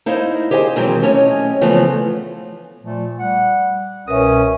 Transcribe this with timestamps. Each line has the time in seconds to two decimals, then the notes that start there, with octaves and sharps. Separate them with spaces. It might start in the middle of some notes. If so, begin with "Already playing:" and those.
0.06 D#4 E4 C5 D#5 F5
0.51 G4 G#4 C5 D#5 F#5 G#5
0.76 B2 D#3 E3 F#3 G#3 C4
1.02 A3 C#4 C#5 D#5 F5 G#5
1.61 C#3 E3 F3 A3 B3
2.83 A#2 F3 A3
3.19 G3 F#5
4.08 C2 B2 C#4 A#4 B4 E5 D#6